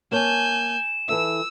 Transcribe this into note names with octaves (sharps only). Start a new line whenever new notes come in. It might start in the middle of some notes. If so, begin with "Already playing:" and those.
A#3 C#5 G#5 A5 G6 E7
E3 A4 E5 E6